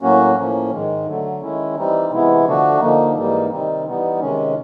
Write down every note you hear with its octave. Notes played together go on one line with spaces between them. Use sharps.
A2 F#3 A#3 C#4 F#4
A2 F3 A#3 C#4
G#2 D#3 G#3
D3 F#3 A3
D#3 G#3 C#4 E4
E3 G3 C4 D#4
C3 E3 G#3 B3 E4
D3 F3 A3 D4 F#4
D3 F3 A#3 D#4
G#2 E3 G3 A#3 D#4
C3 D#3 G3 C4 D#4
E3 G3 B3 D#4
C3 D#3 G#3 C#4